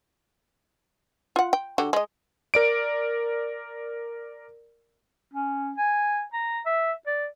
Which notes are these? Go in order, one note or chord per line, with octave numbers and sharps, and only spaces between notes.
F4 F#5
G5
D3 F#4 G4
G#3 D#5
A#4 D5 D7
C#4
G#5
A#5
E5
D5